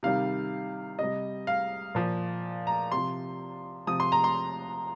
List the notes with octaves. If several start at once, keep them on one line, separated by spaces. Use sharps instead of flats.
C3 D#3 G3 F5
C3 G3 D#5
F5
A#2 F3
A#5
C3 F3 C6
C3 F3 D#6
C6
A#5
C6